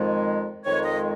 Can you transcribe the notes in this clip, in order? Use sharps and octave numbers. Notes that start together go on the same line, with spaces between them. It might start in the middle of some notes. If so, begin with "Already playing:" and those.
Already playing: F2 D#3 G#3
F2 D#3 G#3 C#5
D#5